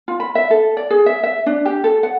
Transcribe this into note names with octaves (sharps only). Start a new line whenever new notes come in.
F4
B5
E5
A4
D5
G#4
E5
E5
D4
G4
A4
F#5